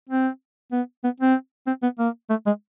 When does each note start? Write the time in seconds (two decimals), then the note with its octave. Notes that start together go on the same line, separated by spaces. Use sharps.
0.09 C4
0.72 B3
1.04 B3
1.20 C4
1.67 C4
1.83 B3
1.99 A#3
2.30 A3
2.46 G#3